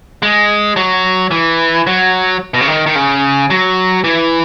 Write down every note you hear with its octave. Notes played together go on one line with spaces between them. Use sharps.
G#3
F#3
E3
F#3
B2
C#3
D#3
D#3
C#3
F#3
E3